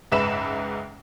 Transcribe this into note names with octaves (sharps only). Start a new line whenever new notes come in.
F#1 C#2 G#2 B4 E5 E7